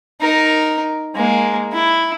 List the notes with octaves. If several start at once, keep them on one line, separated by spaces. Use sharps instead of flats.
D#4 A#4
G#3 A#3
E4